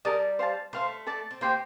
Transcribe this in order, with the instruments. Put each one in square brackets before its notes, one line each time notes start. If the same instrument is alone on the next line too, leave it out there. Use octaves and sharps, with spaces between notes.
[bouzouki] G3 [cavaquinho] A#4 D#5 A5 D#6
[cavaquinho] C5 F5 A5
[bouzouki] A3 [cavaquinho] C5 F5 C6
[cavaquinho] A4 D5 A5
[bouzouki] C4
[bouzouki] A#3 [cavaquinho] G4 C5 G5 C6